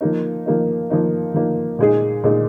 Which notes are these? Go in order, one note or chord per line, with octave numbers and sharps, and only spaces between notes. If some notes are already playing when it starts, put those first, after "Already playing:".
F3 A#3 D#4
F3 A#3 D#4
F3 A#3 D#4
F3 A#3 D#4
A#2 G#3 D#4 G#4
A#2 G#3 D#4 G#4